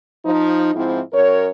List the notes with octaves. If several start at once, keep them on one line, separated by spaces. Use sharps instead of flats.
F3 D#4
G#2 F3 C4 E4
F#2 A#4 C#5